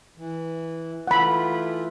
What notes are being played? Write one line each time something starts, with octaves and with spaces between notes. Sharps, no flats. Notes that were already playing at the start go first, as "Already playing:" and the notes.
E3
E3 A3 F4 F#5 B5